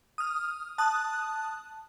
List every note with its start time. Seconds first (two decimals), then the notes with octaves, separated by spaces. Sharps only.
0.18 D#6 F6
0.78 A5 D#6 F#6